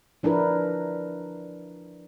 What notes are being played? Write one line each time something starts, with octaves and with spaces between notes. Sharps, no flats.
F3 D4 E4 A#4 B4